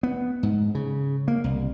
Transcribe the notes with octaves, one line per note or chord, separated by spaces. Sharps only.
B3
G#2
C#3
A#3
C2